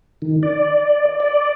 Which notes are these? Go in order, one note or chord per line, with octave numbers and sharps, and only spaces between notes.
D#3
D5
D5